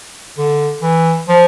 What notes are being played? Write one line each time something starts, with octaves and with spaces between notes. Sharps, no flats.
D3
E3
F3